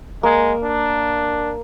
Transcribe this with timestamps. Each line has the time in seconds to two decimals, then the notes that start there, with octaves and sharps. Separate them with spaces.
0.23 G#3 A#3
0.63 D4